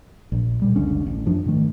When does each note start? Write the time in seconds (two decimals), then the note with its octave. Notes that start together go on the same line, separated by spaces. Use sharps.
0.32 A#1
0.62 A#2 G3
0.76 F#1 C#2 D3 C#4
1.07 A1
1.26 F#2 F3 D4
1.46 G#2 D#3 A3